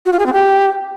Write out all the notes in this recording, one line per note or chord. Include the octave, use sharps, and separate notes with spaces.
F#4
F4
G#4
C4
G4